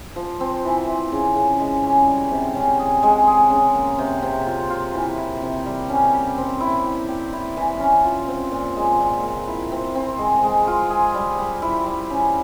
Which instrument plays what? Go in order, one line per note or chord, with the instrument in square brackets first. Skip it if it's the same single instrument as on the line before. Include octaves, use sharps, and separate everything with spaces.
[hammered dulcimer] F3
C4
E3
E3
C#3
C#3
G#3
C#4
G3
C3
C#4
G#4
G#3
G#4
C#3
A#3
C3
C3
F4
F4
E3
E4
C3
G3
C#4
G4
C4
E4
G4
G4
E4
E3
C#4
F4
C4
A#2
G#3
A#2
A#2
E4
C4
C4
G#3
G#3
F4
G#4
G3
G3
E4
G3
C#4